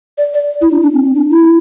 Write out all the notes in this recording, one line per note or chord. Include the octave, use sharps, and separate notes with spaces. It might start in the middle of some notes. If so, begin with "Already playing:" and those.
D5
D5
E4
D4
D4
C4
C4
D4
E4